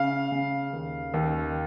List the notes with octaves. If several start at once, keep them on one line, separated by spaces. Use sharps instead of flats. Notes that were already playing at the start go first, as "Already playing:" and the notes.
Already playing: C#3 F5
C#3
D#2
D#2